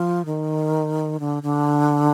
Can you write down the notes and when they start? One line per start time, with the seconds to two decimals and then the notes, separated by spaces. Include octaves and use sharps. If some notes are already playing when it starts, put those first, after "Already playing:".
Already playing: F3
0.26 D#3
1.20 D3
1.43 D3